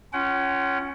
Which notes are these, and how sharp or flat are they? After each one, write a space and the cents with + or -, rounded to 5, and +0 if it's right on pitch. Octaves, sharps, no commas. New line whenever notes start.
C#4 +0 F4 -10 F#5 +40